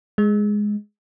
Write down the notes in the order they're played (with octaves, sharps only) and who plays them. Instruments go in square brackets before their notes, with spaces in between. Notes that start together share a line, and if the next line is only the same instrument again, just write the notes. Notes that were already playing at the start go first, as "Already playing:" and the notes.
[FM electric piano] G#3